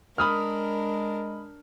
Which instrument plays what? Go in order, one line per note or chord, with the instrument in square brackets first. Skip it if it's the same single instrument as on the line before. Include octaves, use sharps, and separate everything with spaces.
[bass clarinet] G#3 [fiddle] D4 A#4 [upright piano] B5 D#6 F6